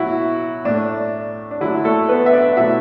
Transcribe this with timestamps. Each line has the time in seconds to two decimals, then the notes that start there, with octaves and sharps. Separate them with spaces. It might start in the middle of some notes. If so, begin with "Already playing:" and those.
Already playing: B2 F#3 A3 E4 F#4
0.65 A2 A3 D4
1.51 D4
1.60 D3 F#3 A3 E4
1.84 A3 A4
2.09 B3 B4
2.26 E5
2.32 D4 D5
2.57 B2 F#3 A3 E4 E5